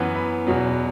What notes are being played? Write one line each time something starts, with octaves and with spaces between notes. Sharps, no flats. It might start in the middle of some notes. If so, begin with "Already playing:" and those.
Already playing: F#2 E3 B3
B5
E2 B2 F#3 B3